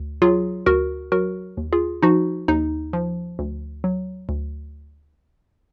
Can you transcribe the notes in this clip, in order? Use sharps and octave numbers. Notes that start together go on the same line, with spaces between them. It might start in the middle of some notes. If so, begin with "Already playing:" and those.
Already playing: D2
F#3 F4 G#4
D2 F#4 A#4
F#3 F#4 A#4
D#2
F4 G#4
F3 D#4 F#4
D#2 D#4
F3
D2
F#3
D2